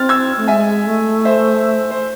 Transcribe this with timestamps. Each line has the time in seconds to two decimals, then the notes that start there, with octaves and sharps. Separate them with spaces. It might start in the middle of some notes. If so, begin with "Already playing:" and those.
Already playing: C4 F6 A6
0.09 E6 G#6
0.37 A3
0.47 G#3 E5 G#5
0.86 A3
1.25 C5 E5
1.91 C5